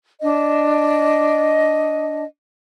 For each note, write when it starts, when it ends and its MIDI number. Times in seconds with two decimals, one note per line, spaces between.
0.21 2.25 62
0.21 2.25 75